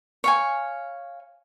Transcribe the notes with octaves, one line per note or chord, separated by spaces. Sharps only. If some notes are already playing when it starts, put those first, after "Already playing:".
C#5 F5 G#5